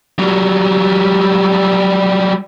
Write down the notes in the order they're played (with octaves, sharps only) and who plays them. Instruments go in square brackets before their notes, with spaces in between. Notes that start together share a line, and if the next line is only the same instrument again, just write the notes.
[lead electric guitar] F#3 G3